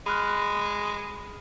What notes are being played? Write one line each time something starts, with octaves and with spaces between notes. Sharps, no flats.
G#3 B5 F6 F#6